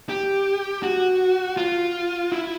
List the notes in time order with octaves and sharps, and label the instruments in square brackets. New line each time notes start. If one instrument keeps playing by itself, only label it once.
[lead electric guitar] G4
F#4
F4
E4